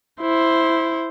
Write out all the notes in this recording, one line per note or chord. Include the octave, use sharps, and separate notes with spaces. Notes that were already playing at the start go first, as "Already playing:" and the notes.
E4 C5